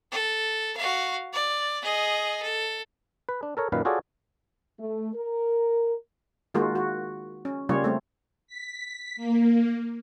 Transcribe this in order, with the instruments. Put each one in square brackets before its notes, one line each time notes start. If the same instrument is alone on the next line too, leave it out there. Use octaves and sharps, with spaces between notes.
[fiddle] A4
F#4 F5
D5
G#4 D#5
A4
[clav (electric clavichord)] B4
D4
A4 A#4 C#5
F#2 A#2 D#3 B4 F5
F4 F#4 G#4 A4 C#5 D5
[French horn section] A3
A#4
[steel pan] D#3 G#3 A#3 F4 F#4
F#4
C#4
C#3 G3 A#3 C#4 F4 C#5
A3 C4
[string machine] B6
A#3